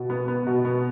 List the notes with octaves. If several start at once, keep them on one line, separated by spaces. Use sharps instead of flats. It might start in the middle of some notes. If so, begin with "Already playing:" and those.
Already playing: B2
B3
B3
B2
B3